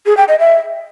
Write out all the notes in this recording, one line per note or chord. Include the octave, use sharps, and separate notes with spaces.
G#4
G5
D#5
E5